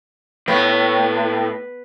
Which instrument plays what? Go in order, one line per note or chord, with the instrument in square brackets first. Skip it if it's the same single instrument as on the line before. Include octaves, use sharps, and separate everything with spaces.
[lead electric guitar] A2 [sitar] B3